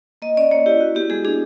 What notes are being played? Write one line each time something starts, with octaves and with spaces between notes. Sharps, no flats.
A#3 D#5
C#4 D5
A#3 C#5
E4 G4
F#4
B3 G4
G#3 G#4
D4 G#4